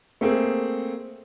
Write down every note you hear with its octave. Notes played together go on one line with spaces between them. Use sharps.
A3 A#3 C4 G#4